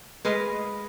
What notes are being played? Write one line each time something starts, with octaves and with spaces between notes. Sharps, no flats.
G#3 B4 D#5 F5